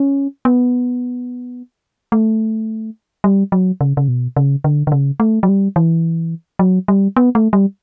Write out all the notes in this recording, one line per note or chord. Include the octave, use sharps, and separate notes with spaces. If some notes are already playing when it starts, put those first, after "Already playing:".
Already playing: C#4
B3
A3
G3
F#3
C#3
C#3
B2
C#3
D3
D3
C#3
A3
F#3
G3
E3
F#3
G3
B3
A3
G3